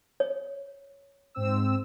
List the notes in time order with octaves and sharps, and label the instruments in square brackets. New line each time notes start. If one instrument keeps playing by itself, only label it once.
[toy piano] C#5
[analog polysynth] G#2 C4 E6